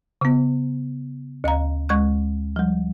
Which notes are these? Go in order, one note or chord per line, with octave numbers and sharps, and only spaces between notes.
C#3 B3
D2 D#5 F5 A#5
D2 G#3 C#6 F#6
F3 G3